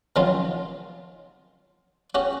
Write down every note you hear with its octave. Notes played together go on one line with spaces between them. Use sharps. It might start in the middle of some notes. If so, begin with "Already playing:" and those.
C3 D#3 F3 F#3 C#4 F4
C#4 F#4 G4